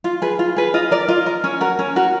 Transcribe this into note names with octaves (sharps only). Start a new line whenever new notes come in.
F4
G#4 B4
F4
G#4 B4
F4 D#5
A#4 D5
F4 D#5
A#4
C#4
F#4 A#4
C#4
F#4 A#4